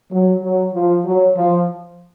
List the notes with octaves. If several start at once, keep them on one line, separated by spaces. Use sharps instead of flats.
F#3
F#3
F3
F#3
F3